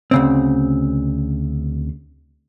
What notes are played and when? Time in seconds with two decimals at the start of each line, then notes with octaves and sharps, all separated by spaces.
0.11 D2 C#3 C4